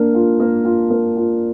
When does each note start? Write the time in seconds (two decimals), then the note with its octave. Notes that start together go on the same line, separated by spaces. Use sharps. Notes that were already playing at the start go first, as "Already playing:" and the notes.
Already playing: A#3 D4
0.15 F4
0.40 A#3
0.65 F4
0.90 A#3
1.17 F4